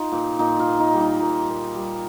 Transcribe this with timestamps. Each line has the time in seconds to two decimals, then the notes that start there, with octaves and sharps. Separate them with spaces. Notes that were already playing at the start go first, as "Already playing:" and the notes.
Already playing: D#4 F4
0.12 A#2
0.39 A#2 D#4
0.59 F4
0.66 A#3
0.79 D#4
0.93 G3
1.00 D#4
1.20 A#2
1.48 A#2
1.75 G3